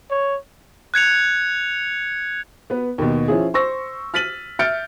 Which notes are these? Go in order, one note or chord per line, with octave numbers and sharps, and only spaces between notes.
C#5
F#6 G#6 C#7 F7
B3 B4
D#2 B2
F3 C#4 E4 G#4
C5 C#6 E6 A#6
F6 A6 B6 D#7 F#7
E5 F6 G6 A6 C#7 D7